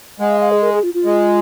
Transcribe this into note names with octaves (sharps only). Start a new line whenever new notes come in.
G#3 F#5
F5
F5
G#4
A#4
G#4
F4
F4
G#3